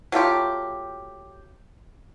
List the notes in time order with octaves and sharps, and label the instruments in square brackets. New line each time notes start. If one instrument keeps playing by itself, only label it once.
[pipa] F#3 A3 F4 G4